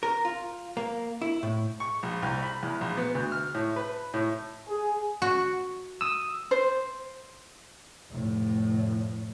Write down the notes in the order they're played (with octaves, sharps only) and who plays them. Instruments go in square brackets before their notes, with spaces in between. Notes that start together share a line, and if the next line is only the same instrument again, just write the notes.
[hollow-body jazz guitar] A#4
F4
A#3
E4
A2
[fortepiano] C#6
A#1
C2
B5
E2
A#1
B3
D2
F6
A2
B4
A2
[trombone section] G#4
[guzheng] F#4
[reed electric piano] D#6 E6
[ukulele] C5
[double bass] F1 A2